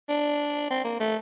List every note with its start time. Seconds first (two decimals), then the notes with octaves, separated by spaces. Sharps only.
0.09 D4
0.70 C4
0.84 A#3
1.00 A3